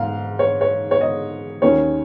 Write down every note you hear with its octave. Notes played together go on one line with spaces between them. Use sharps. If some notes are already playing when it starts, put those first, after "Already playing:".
Already playing: G#2 F5
C#5
C#5
C#5
D#5
D#2 D#3 C#4 C#5